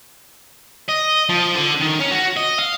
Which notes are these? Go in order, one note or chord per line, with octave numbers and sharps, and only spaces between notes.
D#5
F3
D3
D#3
C#4
F#4
D#5
F5